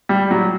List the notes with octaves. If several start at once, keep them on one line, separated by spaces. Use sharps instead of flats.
G3
F#3